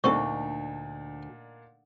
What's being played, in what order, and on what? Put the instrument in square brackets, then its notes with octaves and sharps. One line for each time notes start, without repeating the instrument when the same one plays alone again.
[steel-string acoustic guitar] D2 [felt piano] A#2 D4 D#4 [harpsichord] G3 C4 A4 [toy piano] C#6